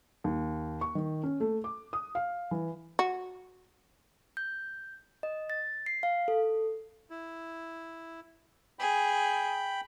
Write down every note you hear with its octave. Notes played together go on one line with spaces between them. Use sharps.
D#2
C#6
D#3
C#4
A3
D6
D#6
F5
E3
F#4
G6
D#5
A6
C7
F5
A4
E4
G#4 G5 B5